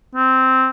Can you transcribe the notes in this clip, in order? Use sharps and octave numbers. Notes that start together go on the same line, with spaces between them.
C4